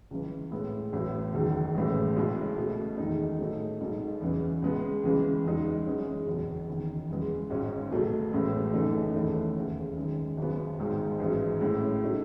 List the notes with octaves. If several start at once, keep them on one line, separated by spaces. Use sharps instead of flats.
C#2 C#3 E3
A2 G#3 B3 E4
A1 A2 F#3
F#1 E2 D#3 F#3
A1 A2 E3 G#3
C#2 B2 G#3 C#4 E4
C#2 B2 A3
E2 D#3 G#3 D#4
A2 F#3 A3 D#4
B1 B2 G#3 D#4
E2 C#3 E3
C#2 C#3 G#3 B3
C#2 C#3 E3 G#3
E2 C#3 G#3 D#4
F#2 E3 G#3 C#4
F#1 E2 B2
F#1 E2 D#3
E2 C#3 E3 G#3
G#1 G#2 D#3 G#3 C#4
C#2 B2 F#3 A3
A1 A2 G#3 C#4
F#1 F#2 E3 A3 D#4
E2 D#3 A3 C#4 E4
E1 D#2 C#3
F#2 D#3 G#3
G#1 F#2 C#3 F#3 B3
G#1 G#2 D#3 G#3
A1 G#2 F#3
A2 G#3 C#4 E4
C#3 F#3 A3 D#4